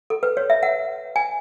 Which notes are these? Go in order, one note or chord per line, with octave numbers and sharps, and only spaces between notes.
A4
B4
C#5
E5
F#5
G#5